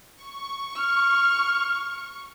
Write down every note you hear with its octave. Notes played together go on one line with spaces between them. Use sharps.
C#6
F6